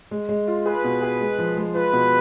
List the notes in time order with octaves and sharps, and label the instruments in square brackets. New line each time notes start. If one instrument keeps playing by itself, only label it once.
[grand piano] G#3
G#3
F4
[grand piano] G#4 [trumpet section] B4
[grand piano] B2
G#4
G#3
F3
G#3
[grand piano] F4 [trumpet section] B4
[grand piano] B2